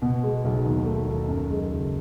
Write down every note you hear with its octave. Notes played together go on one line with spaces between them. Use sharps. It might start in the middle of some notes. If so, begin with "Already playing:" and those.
B2
G#3
B1
D#2
A3
D#2
F#2
G#3
F#1